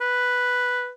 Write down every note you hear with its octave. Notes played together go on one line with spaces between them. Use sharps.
B4